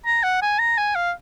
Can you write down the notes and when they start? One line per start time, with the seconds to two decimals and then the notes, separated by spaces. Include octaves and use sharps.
0.06 A#5
0.23 F#5
0.42 G#5
0.59 A#5
0.78 G#5
0.96 F5